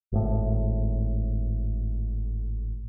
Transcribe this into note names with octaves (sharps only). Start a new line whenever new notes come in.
G#1 A2